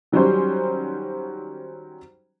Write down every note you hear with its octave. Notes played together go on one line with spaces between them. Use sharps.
D#3 F#3 G3 C#4 C5